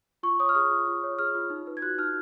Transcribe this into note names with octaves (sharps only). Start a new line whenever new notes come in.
F4 C#6
C#5 D#6
F6
G#4 D#6
F4
F4
C#5
G#4 F6
F4
D#4
B4
G#6
F#4 F#6
D#4 F6